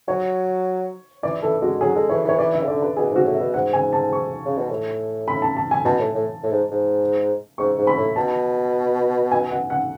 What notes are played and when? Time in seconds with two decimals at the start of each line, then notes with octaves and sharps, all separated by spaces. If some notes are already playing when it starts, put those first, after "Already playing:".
0.08 F#3 C#5
1.23 E3 D5
1.42 E3 A4
1.62 G#3 F#4
1.81 F#3 G#4
1.95 G#3 A4
2.10 E3 C#5
2.25 E3 C#5
2.39 E3 D5
2.53 E5
2.63 C#3
2.67 D3 D5
2.82 B4
2.96 B2 G#4
3.11 G#2 F#4
3.25 A2
3.35 E5
3.40 B2
3.54 G#2 F#5
3.73 G#5
3.93 A5
4.13 C#6
4.45 C#3
4.58 B2
4.70 A2
5.28 B5
5.42 A5
5.57 A5
5.71 G#5
5.85 B2 A5
5.99 A2
6.14 A2
6.43 A2
6.52 G#2
6.71 G#2
7.58 G#2 C#6
7.78 G#2
7.87 B5
7.98 A2
8.16 B2 A5
9.31 G#5
9.51 F#5
9.70 F#5